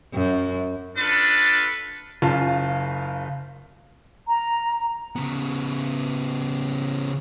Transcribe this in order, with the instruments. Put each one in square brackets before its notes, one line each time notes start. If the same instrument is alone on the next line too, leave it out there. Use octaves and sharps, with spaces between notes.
[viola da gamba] F#2
[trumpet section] D4 F4 A4 B4
[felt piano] F#1 C#3 F4 F5 A5
[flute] A#5
[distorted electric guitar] C#3 B3